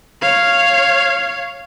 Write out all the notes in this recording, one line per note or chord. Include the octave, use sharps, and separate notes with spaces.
C#5 F5